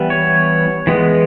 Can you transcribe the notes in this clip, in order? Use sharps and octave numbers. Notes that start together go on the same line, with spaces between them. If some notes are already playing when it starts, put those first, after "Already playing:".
Already playing: E3 G3 B3
C#5
E3 G#3 B3